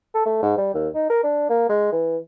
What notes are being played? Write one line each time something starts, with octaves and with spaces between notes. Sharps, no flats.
A4
A3
G#2
G3
D#2
D#4
A#4
D4
A#3
G#3
E3